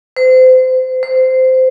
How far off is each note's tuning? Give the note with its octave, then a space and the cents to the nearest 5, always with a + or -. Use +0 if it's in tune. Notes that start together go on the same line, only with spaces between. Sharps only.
C5 -30
C5 -15